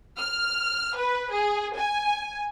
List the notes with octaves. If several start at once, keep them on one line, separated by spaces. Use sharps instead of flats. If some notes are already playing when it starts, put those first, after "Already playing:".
F6
B4
G#4
G#5